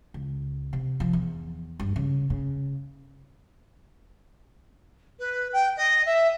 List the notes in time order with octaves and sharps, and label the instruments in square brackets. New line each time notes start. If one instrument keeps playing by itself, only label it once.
[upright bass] C#2
C3
F3
E2
G2
C#3
C#3
[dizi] B4
G5
D#5
E5